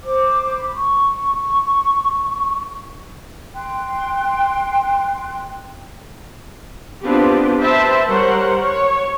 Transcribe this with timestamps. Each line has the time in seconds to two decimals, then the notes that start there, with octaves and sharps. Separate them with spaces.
0.02 C5 D6
0.57 B5
0.75 C#6
3.54 G5 C6 F#6
7.04 B3 C4 D4 F4 G4 B4
7.60 B4 C5 E5 G5 A5 B5
8.06 G3 A#4 C5 C#5 F#5
8.61 C#5